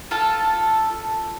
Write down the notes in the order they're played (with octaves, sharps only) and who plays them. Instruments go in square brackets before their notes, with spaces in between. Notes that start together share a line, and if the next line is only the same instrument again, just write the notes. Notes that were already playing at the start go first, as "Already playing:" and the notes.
[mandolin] F4 A4 A5